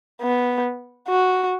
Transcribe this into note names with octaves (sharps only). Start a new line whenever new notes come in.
B3
F#4